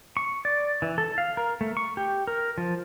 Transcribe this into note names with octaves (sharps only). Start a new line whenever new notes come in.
C#6
D5
E3
A4
F5
A#4
A3
C#6
G4
A#4
F3